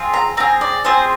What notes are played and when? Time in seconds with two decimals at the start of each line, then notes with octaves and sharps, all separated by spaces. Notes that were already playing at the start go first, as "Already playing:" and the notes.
Already playing: C4 F4 G#4
0.14 A#5
0.37 C4 F4 G#4 A#5
0.61 D5
0.84 C4 F4 G#4 C5